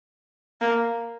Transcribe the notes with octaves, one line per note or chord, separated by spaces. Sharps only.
A#3